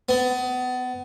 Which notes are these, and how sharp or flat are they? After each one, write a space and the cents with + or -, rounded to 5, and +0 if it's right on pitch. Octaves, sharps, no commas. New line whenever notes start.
B3 +30